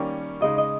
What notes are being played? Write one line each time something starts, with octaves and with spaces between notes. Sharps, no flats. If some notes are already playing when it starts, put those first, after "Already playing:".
Already playing: D#3 G3 A#3 C#4 G4
C#3 G#3 D#4 D#5
D#5